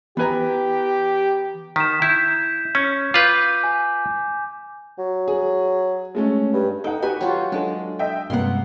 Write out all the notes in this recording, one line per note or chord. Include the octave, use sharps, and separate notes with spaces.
E3 B3 G4 B4 G#5 A#5
D#3 B6 E7
E4 G6
C#4
F4 B4 D6 G6
G#5
F#3
G#4
G#3 A3 C#4
G2
D#4 A4 F#5 G5
F#4 G4 B4 G#5
F#3 F4 G5
F#3 G#3 D4 A4
D#5 E5 G5
G2 C3 G#3 A#3 B3 F#5 C6